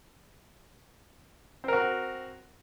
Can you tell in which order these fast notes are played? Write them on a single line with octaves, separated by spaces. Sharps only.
C4 A#4 F#4